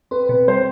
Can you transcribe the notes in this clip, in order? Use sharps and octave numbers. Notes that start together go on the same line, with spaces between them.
C4 B4
B2 B4
G3 C5